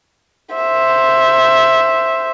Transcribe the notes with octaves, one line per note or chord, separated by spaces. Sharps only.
C5 E5